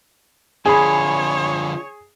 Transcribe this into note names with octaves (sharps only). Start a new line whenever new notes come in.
D3 F3 G#4 C#5 G#5 B5